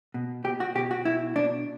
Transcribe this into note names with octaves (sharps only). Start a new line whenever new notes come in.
B2
B2 G4
F#4
B2 G4
F#4
B2 E4
B2 D4